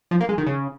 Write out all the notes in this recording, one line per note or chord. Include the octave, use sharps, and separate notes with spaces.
F3
A#3
G#3
D#3
C#3